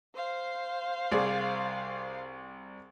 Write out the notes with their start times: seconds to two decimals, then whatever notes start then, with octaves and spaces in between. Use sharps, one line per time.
0.16 C5 F5
1.11 C2 G#4 D5